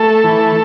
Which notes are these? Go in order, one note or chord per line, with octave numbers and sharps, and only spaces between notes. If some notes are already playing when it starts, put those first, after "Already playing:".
Already playing: A3 A4
E3